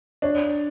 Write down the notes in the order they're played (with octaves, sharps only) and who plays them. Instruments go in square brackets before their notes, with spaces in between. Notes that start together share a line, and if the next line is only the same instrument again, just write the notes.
[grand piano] D4 [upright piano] C#5